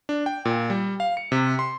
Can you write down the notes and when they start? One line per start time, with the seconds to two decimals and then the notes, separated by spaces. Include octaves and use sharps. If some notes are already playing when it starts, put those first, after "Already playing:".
0.09 D4
0.26 G5
0.45 A#2
0.70 G3
1.00 F5
1.17 C#7
1.32 C3
1.59 C6